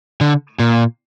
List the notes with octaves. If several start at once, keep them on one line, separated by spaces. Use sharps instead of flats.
D3
A#2